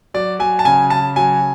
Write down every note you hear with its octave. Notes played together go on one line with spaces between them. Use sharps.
F#3 D5
F#3 G#5
A5
C#3 G#5
C#3 A5
F#3 G#5